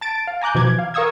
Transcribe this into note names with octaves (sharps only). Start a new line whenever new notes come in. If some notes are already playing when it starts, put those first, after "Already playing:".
A5 A6 D7
F5
G#5 A#5 D6 F#6 G6
B2 E3 F3 D6 G#6
F5
A#4 F5 C#6 D#6 E6 G#6